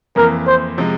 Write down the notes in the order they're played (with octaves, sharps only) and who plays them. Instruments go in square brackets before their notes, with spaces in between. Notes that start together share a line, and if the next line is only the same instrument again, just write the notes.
[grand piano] F2 E3 A#3 [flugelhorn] A#4
[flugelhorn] C5
[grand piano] C3 F3 G#3